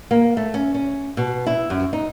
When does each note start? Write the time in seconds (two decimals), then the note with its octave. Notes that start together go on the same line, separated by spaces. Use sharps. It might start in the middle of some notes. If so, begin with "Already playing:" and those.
0.11 A#3
0.37 A3
0.54 C#4
0.74 C#4
1.17 B2
1.47 E4
1.70 F#2
1.93 D#4